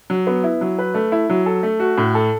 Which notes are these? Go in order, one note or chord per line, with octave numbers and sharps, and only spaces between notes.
F#3
B3
E4
F#3
B4
A3
E4
F#3
A4
A3
F#4
A2
A4